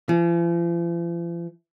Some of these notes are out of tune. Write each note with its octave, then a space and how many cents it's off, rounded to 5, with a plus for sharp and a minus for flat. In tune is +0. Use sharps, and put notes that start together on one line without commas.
F3 -45